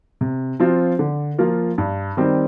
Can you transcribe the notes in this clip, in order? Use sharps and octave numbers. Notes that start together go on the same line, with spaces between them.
C3
F3 C4 F4
D3
F3 A#3 F4
G2
D#3 G3 C4